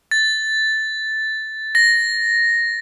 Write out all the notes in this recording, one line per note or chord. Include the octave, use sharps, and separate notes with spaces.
A6
A#6